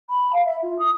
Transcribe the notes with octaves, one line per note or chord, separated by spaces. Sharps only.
B5
F5
E5
F4
D#6